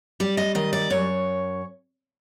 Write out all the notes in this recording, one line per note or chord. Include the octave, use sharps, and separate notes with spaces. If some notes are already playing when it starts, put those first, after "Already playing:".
G3 D5
D#5
D#3 D#5
D5
F#2 C#5